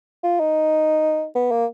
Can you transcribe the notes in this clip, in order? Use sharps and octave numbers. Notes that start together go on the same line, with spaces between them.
F4
D#4
B3
A#3